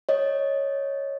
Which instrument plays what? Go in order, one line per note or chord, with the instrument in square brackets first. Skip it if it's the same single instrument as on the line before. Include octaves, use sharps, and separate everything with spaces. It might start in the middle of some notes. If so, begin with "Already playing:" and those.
[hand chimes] C#5 D#5